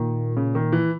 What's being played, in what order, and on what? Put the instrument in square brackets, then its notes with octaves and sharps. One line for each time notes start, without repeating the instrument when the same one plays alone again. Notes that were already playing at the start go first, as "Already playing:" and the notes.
Already playing: [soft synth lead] A#2 [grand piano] D#3
[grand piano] C#3
D#3
E3